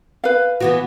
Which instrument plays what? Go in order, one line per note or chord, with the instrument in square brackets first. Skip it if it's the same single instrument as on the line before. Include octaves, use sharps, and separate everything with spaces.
[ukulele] B4 F5
[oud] E3 B3 F#4